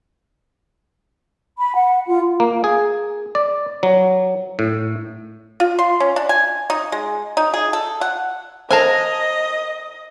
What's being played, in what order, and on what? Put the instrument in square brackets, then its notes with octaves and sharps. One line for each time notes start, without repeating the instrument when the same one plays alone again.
[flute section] B5
F#5
F4
[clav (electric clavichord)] A#3
G#4
D5
F#3
A2
[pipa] F4
C6
C#4
D4
G#5
D#4
G#3
D#4
G#4
A4
F#5
[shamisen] A4 A5 [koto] A#4 F5 G#5 [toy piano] C5 [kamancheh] D#5